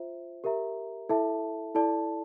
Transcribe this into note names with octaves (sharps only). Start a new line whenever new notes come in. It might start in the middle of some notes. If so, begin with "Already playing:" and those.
Already playing: F4 C5 E5
G4 A#4 E5 A#5
E4 A4 E5 A5
E4 A4 D5 A5